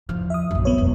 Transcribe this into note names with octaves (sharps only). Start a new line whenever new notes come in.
E2 F3 F6
E5 D#6
A#1 F#2
B3 B4 C#5
E1